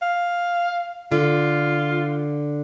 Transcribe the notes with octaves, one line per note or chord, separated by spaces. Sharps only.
F5
D3 F4